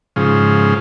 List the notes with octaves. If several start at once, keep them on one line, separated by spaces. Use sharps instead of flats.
G#2 C#3 F3